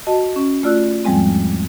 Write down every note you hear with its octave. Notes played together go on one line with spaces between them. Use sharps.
F#4 D#5 A5
C#4
A3 F4 D5 E6 F#6
E2 G#2 F3 G3 G#3 C4